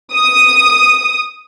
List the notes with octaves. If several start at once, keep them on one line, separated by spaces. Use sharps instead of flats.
D#6